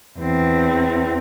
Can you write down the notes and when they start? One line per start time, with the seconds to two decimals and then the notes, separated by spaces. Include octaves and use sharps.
0.20 E2 C4